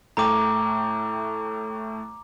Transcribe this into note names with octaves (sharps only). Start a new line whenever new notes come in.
A2 A3 G5 A#5 D6